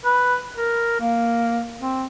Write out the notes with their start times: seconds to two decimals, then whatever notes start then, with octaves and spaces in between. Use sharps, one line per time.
0.05 B4
0.56 A#4
1.00 A#3
1.80 C4